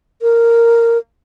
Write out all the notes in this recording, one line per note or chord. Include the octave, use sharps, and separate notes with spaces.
A#4